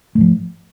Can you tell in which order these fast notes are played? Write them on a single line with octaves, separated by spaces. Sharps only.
A3 G#2 F3